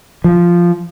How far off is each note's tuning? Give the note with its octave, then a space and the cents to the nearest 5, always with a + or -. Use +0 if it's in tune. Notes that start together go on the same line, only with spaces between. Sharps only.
F3 -5